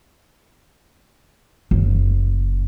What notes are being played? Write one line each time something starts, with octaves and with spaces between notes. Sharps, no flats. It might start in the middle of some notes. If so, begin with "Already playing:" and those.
F#1